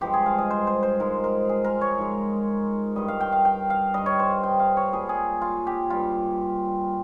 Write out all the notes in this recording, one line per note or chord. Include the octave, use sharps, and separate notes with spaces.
G2 F3 G#3 G4
G#4
F5
D#5
C5
C5
C5
G#2 F3 G#3 A#4
A#4
G#4
A#4
C#5
G#2 F3 G#3
G2 G3 D#5
F5
G5
F5
G5
F5
G2 G3 D#5
C#5
C5
G5
F5
C#5
A#2 G3 G#4
G#4
F4
G4
G2 G3 F4